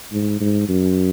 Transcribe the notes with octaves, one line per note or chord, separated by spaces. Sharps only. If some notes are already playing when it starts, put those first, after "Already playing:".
G#2
G#2
F#2